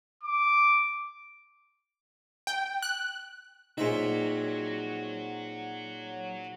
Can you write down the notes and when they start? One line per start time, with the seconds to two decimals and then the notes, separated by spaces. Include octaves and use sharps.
0.23 D6
2.47 G5
2.82 F#6
3.78 A#2 C4 D#4 F#4 G#4 C#5 E5